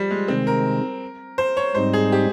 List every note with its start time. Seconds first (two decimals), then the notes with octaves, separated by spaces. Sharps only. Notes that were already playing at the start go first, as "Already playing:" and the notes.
Already playing: F3 G3
0.11 G#3
0.28 C3 D#3 G#3 C4
0.47 A#4
1.38 C5
1.57 C#5
1.75 G#2 G3 C4 D#4 C5
1.94 G#4
2.12 G4